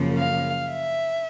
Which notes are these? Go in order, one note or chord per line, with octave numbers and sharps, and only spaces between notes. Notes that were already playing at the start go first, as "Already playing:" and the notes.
Already playing: F#2 C#3 F3 A#3
F5
E5